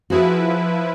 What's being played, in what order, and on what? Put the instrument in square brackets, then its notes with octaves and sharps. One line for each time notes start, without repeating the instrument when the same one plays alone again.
[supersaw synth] F3 E4 B4 [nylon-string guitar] F#4 G#4